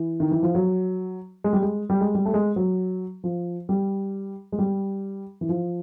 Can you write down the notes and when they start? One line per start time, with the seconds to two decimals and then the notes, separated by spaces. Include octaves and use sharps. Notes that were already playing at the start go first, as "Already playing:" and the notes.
Already playing: E3
0.20 D#3
0.31 E3
0.43 F3
0.55 F#3
1.44 G#3
1.53 G3
1.62 G#3
1.90 G3
2.01 G#3
2.15 G3
2.25 A3
2.34 G#3
2.56 F#3
3.24 F3
3.69 G3
4.52 G#3
4.58 G3
5.41 E3
5.49 F3